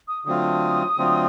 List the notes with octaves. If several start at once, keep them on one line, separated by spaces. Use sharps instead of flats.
D#6
D3 F#3 A3 C4 F4 D#6
D3 F#3 A3 C4 F4